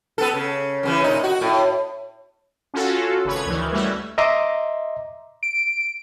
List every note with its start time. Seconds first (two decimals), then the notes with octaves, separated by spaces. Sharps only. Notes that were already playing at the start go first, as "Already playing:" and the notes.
0.18 B3 A4
0.34 C#3
0.83 F#2 C#3 E3
1.04 A#2 D#4
1.24 F#4
1.41 A2
2.74 C#4 F4 F#4 A4
3.25 G#1 C#3 B4 C#5 G#6
3.45 D2 D#3 E3
3.72 E3 G3 A3 C#4 F#4 E5
4.18 D#5 E5 A#5 C6 D6
5.43 D7